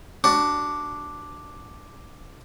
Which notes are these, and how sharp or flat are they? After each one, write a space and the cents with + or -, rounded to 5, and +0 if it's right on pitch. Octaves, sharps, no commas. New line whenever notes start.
D4 +0 F#4 +20